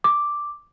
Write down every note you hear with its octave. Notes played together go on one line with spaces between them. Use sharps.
D6